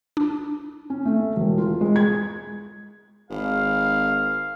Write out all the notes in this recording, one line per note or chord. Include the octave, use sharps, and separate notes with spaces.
D4
C#4
A3
E1
F4
G#3
G#6
G#1 F5